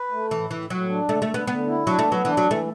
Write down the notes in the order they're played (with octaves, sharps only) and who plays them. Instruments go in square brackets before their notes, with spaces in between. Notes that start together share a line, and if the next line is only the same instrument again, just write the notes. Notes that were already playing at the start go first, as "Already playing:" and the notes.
Already playing: [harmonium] B4
A3
[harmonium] A2 [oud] E3
[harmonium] A2 [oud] E3
[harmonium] A2 [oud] F#3
[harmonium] D4
[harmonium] D3 [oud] A3
[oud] A3
[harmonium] D3
[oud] B3
[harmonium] D3 [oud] B3
[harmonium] E4
[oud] F#3 [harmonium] D4
[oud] A3
[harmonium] B3
[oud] F#3
[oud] E3 [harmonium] D4
[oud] F#3
[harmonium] E3
[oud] A3